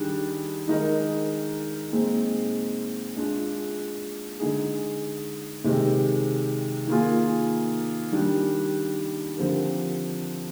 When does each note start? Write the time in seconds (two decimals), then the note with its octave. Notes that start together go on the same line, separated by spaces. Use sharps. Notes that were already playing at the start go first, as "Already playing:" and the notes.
Already playing: D#3 G3 D4 G#4
0.68 D#3 G#3 D#4 A#4
1.92 A#2 G#3 C4 D#4 G#4
3.16 G#3 D4 F4 G#4
4.40 D3 G#3 D#4 G#4
5.64 C3 D#3 G#3
6.88 D#3 A#3 F4 G#4
8.12 D#3 G3 D4
9.37 D3 F3 C4 G4 A#4